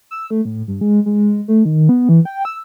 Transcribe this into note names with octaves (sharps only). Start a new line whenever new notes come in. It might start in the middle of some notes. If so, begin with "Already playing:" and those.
E6
A3
A2
G2
G#3
G#3
A3
D#3
B3
E3
G5
E6